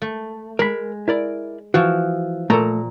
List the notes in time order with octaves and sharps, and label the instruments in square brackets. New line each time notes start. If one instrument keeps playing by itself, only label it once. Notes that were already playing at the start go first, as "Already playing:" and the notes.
[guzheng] A3
[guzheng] G#3 [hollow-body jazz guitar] A#4 B5
[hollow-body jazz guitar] E4 A#4 D5
[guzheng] E3 F3 [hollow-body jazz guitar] F#4
[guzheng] A#2 A#5 [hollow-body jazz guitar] A3 A4